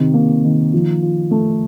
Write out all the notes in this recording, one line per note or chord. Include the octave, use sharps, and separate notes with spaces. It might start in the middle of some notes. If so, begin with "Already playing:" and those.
Already playing: C3 D#3
A#3
D#3
F3
F4
A3